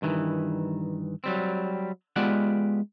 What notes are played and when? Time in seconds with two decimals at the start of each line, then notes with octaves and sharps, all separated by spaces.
0.02 G2 D#3 E3
1.24 F#3 G3 C4
2.16 G#3 B3 F4 G4 D5 F#5